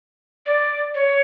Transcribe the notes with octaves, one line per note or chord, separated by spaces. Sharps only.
D5
C#5